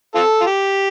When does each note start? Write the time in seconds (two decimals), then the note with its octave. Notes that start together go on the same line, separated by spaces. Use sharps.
0.15 C4 F4 A4
0.41 F4
0.46 G4